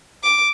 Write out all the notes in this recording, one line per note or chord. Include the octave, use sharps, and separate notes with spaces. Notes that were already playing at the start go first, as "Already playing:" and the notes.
D6